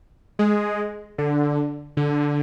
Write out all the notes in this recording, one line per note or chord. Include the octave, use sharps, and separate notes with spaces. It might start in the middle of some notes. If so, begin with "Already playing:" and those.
G#3
D3
D3